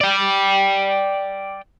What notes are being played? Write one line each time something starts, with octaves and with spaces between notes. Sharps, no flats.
D5 G5